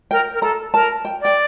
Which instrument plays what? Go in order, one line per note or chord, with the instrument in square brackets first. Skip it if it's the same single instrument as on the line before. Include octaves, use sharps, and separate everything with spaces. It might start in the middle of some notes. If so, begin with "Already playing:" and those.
[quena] A#4 [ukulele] G5
[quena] A#4
[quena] A4 [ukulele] A#5
[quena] A#4 [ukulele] A5
[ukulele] G5
[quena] D5 [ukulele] G5